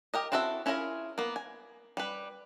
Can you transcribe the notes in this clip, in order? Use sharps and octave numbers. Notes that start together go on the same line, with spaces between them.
G4 A#4 D#5
C4 E4 F#4 A4 E5
C#4 E4 F4 G#4 A#4
A#3 B3
G#5
G3 B4